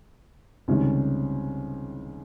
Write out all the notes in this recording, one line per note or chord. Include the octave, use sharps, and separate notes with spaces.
C#2 C3 D#3 G3 C#4